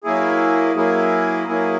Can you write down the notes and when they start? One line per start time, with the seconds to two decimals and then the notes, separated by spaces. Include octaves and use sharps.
0.04 F#3 A#3 E4 G#4
0.75 F#3 A#3 E4 G#4
1.47 F#3 A#3 E4 G#4